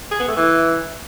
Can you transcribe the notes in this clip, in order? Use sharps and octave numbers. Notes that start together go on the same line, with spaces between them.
G#4
B3
A3
E3